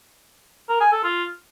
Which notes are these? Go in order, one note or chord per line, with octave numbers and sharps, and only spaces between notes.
A#4
G#5
A4
F4